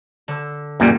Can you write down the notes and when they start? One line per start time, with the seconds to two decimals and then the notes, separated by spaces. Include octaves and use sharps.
0.28 D3 E6
0.80 F#2 A#2 G3 A#3